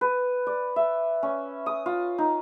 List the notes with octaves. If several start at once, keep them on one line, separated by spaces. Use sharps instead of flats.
B4
D5
E5
C#4
D#6
F4
D#4